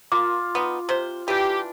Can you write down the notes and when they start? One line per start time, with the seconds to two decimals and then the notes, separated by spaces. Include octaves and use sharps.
0.12 A#3 F4 D6
0.55 B3 D#4
0.89 C3 C5
1.28 E3 D4 G4